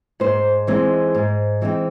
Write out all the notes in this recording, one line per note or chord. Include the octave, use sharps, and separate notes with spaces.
G#2 C5
E3 G#3 C4 D#4
G#2
E3 G#3 C4 D#4